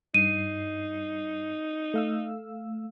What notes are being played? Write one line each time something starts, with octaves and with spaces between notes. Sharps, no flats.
G2 D#4 C7 D#7
A3 F5 E6